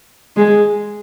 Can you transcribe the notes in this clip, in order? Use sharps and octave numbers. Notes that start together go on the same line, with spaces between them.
G#3